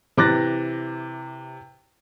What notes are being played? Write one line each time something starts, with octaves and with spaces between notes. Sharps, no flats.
C3 E3 D6 F#6 A6 A#6